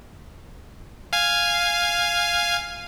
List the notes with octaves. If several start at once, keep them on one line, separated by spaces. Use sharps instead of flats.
F5 G#5